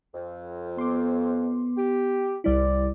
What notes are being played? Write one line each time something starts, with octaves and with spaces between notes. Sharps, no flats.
F2
B3 C6 D6
G4
C2 G3 C4 E4 D5